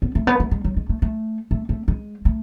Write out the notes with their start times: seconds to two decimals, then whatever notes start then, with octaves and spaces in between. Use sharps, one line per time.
0.02 B3
0.15 A3
0.27 B3
0.40 A3
0.51 G#3
0.64 F#3
0.77 G#3
0.89 A3
1.02 A3
1.51 A3
1.69 A3
1.88 G#3
2.25 A3